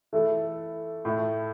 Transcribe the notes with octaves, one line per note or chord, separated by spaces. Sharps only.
E3 A3 E4 A4
A2 A3 E4